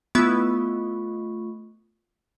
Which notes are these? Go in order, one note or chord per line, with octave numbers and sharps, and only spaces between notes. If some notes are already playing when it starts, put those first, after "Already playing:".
A3 B3 E4 F4 C#6 E6